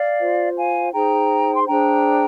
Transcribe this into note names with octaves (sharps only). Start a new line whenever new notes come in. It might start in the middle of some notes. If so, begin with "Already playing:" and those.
Already playing: D5 F5
F4 C5
F5 G#5
D#4 G#4 C5 G5 A#5
C6
D4 G#4 C5 G5 A#5